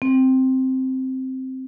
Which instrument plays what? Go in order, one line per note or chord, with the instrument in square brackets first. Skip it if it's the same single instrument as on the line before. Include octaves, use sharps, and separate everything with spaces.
[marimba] C4